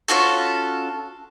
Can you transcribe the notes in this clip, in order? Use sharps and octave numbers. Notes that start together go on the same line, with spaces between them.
C#4 F4 F#4 A4